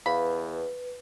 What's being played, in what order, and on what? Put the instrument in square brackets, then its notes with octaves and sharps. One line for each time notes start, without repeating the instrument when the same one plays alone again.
[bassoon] E2 [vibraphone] B4 [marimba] F5 [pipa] B5